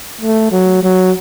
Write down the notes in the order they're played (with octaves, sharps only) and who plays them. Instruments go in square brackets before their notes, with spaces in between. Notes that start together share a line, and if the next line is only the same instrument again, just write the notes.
[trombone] A3
F#3
F#3